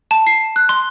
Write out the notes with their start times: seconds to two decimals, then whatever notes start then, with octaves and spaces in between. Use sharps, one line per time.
0.11 A5
0.27 C7
0.56 F#6
0.69 C6